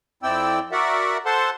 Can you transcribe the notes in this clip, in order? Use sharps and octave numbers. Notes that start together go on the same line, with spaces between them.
F2 C4 E4 D5 G5 E6
F#4 A#4 D5 E5 F#5
A4 C5 F#5 A5 C6